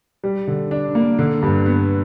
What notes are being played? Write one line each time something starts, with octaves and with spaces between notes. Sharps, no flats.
G3
D3
D4
A#3
D3
G2
B3